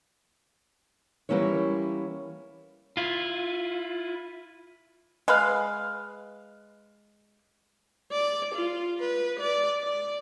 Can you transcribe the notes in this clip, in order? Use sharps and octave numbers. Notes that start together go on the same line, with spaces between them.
E3 G3 A#3 C#4 E4 C#5
E4 F4
G#3 B4 F5
D5
F4
B4
D5
D5